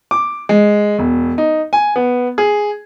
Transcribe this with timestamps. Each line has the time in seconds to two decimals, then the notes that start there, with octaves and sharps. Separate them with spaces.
0.11 D6
0.49 G#3
0.99 E1
1.38 D#4
1.73 G#5
1.96 B3
2.38 G#4